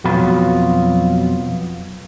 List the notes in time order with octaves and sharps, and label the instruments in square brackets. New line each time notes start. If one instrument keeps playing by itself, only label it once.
[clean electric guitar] F2 B2 F#3 B3 F4 B5